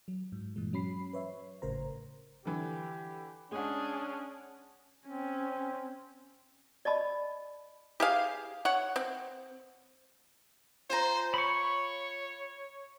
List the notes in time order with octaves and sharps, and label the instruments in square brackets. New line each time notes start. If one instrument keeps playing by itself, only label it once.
[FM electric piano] F#3
G#2
G2 A#2 E3 G#3
F#3 C#4 B5 C7
B4 C#5 E5
G#1 A2 C#3 A#4 C5 A#5
[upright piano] D3 E3 [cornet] G4
[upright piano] G#3 F#5 [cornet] C#4 [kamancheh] D4 G#4
[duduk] C4 [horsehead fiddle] C#4
[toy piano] D5 D#5 A5 B5
[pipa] G4 G#4 F5
C#5 F#5
C4
[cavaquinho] F4 G#5 A#5 [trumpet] C5
[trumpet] C#5 [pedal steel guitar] B5 C#6